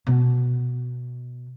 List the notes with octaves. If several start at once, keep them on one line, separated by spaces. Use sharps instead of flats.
B2 B3